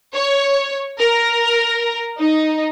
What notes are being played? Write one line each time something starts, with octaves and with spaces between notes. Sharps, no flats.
C#5
A#4
D#4